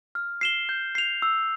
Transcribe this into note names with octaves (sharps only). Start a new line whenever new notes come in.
F6
C7 E7 G7
G6
C7 F7
E6